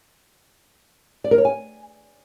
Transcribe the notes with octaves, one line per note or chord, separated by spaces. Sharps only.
D5
A#4
C#5
G#5